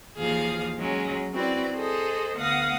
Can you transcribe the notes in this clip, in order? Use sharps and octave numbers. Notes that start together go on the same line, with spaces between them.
D#2 E3 F3 G#4 F5
F#3 G#3 C#4
C4 E4 F#4 B4 D5
G#4 A4 C5 D#5
D2 B3 F5 F#5 D#6 A#6